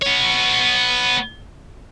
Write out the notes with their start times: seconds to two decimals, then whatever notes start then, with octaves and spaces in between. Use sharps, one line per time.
0.02 B3 C#5